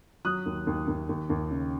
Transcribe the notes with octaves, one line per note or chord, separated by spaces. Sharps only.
F#3 D#6 F#6
D#2
D#2
D#2
D#2
D#2
C#3